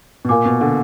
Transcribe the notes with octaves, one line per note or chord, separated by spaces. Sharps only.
B2
A#2 A#4 F5 G#5 D6
B2
D3